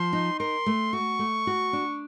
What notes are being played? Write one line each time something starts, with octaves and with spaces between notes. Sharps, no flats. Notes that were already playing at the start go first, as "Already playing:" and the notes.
Already playing: F3 C6
D#4
A#4 C6
A3
F#4 C#6
A3
F#4
D4